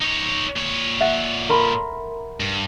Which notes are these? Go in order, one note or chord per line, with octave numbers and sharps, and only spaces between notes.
D#4 C#5
A#2 C#5
E5 F#5 A6
A#4 B5 C6
G2